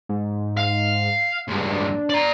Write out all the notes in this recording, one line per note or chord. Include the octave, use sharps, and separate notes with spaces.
G#2
F5
C#2 G2
D4
D5 A#5